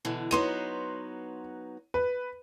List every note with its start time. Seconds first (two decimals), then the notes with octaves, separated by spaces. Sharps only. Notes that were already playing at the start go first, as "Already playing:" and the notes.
0.05 B2 D3 E3
0.31 F#3 B3 D#4 C6 D#7
1.94 B4